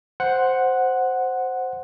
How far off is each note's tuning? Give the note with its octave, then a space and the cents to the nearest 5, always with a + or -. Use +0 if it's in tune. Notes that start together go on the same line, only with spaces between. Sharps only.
C5 +0 F#5 +0